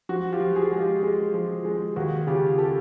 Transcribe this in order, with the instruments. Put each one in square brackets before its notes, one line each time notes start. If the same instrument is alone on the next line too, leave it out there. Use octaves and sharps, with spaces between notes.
[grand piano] F3 F#4
F4 G4
F3
F#4 G#4
G#3
F4 G4
G#3
F3
G#3
D#2 F#4
C#3 F4 G4
G4 A4